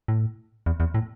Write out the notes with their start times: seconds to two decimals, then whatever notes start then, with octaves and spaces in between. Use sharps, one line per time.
0.08 A2
0.66 E2
0.80 E2
0.94 A2